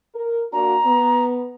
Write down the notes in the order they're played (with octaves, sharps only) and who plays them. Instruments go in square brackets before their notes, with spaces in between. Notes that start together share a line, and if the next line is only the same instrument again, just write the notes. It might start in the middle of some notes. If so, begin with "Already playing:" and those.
[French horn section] A#4
[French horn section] A#3 D4 F#4 [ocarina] A#5
[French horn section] B3